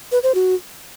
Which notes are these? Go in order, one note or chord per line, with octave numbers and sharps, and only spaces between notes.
B4
C5
F#4